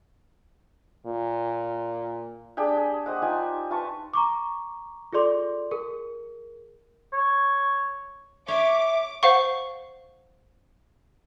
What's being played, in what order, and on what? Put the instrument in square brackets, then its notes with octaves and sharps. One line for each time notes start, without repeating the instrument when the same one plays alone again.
[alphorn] A#2
[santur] D4 G4 G#4 G5
G#4
G4 C5 D#5 F#5
D#4 F4 G4 G#5
F4 B4 A5 C#6
[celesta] A#5 C#6 D6
F4 G#4 A4 D5 C6 D6
G#4 A#4
[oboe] C#5
[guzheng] C#5 [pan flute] E5 [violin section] D6
[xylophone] C5 F5 F#5 C#6